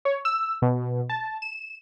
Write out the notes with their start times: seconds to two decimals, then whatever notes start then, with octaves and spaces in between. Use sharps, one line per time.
0.05 C#5
0.25 E6
0.62 B2
1.09 A5
1.42 E7